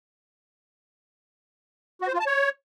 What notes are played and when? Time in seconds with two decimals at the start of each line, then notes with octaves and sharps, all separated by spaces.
2.01 F#4
2.07 C5
2.14 F4
2.20 A5
2.26 C#5